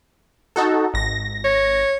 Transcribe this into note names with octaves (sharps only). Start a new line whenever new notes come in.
D#4 F#4 A4
G#1 A#6
C#5